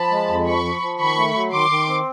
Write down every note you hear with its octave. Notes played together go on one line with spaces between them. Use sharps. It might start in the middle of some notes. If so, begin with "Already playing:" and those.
Already playing: F3 A5 B5
G#3
F2
F3 B5 C#6
F3
F3
D#3 B5 C#6
A3
F#3
D#3 C6 D6
D#3
C4